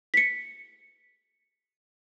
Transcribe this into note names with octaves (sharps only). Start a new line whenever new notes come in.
B6 C#7